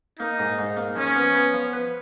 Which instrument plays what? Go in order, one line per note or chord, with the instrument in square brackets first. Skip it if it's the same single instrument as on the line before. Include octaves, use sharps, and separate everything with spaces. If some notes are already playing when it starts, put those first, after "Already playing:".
[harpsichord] A#3 [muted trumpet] D#4
[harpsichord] G#2
G#2
A#3
[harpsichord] F3 [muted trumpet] C#4
[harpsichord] B3
B3
F3
B4